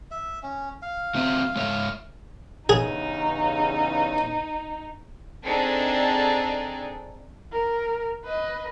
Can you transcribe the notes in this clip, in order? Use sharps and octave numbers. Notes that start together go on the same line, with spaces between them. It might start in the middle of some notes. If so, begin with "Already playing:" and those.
E5
C#4
F5
F#3 C4 E5
G#3 C#5 E5
E2 G2 C#3 D#4 G#4
C4 D4 D#4 G#4 A4
A#4
B4 D#5